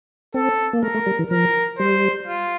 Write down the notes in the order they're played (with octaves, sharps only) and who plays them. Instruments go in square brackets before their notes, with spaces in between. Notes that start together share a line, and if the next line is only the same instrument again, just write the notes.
[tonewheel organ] C4 [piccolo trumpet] A4
[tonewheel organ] A#3
[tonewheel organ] A3 [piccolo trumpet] A#4
[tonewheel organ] A3
G3
E3
[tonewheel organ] F3 [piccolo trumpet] A#4
[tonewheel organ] G3 [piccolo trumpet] C5
[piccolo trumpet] F4